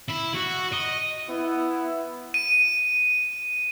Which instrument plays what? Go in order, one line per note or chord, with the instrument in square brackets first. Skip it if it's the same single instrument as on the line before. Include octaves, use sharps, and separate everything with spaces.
[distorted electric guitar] E4
F#4
D#5
[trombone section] B3 E4
[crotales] D#7